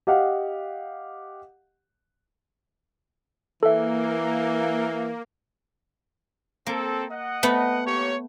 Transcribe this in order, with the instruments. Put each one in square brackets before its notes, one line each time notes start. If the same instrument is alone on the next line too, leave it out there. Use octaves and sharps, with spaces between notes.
[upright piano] G4 D#5 F5 F#5
[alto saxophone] E3 [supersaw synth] A#3 [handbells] A4 E5
[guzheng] A#3 [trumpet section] C4 A4
[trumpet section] D#5 F#5
[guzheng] A3 B3 B4
[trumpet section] A#3 G4 C#5